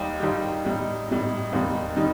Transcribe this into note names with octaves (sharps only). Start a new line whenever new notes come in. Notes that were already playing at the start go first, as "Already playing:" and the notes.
Already playing: D#2 D#3 G3 D#4 G4
D#2 D#3 G3 D#4 G4
A2 G3 D#4
A2 G3 D#4
E1 D#2 D#3 G3 D#4
D#3 G3 D#4